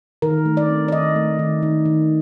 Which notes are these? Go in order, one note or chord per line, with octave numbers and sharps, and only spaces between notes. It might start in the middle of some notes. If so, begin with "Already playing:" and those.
D#3 A#4
A3
D5
C4
D5
D#3 D#5
A3
D#3
D#3
D#3